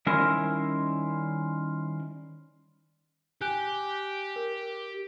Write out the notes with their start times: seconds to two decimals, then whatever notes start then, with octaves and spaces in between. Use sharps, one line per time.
0.06 D#3 G3 C#4 E4 A#4 C5
3.41 G4 G#5 F#6 G6
4.36 A#4